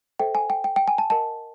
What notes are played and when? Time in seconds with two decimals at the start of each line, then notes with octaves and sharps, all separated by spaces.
0.19 A4 C5 E5 G5
0.35 G#5
0.50 G5
0.64 G5
0.76 G5
0.88 G#5
0.98 A5
1.10 A#4 D#5 F#5 A5